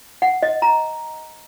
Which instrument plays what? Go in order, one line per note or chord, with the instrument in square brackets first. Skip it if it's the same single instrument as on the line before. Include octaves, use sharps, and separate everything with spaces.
[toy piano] F#5
D#5
A#5